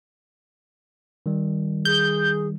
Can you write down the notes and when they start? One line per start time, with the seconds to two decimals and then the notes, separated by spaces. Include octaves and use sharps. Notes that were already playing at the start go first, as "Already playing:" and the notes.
1.26 D#3 G3
1.85 G#4 G6